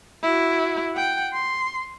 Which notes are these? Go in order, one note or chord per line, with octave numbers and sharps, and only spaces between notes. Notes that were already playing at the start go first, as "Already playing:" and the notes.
E4 F#4
F#5 G5
C6